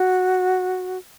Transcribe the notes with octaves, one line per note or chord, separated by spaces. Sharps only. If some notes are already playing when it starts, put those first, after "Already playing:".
Already playing: F#4